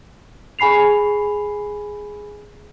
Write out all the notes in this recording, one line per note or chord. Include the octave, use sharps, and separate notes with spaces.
G#4 G#5 B5 C7 F7